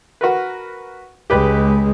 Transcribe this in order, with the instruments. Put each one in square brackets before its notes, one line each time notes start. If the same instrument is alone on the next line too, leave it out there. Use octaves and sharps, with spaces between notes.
[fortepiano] F#4 A#4 B4
[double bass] C#2 G#3 [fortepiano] G4 B4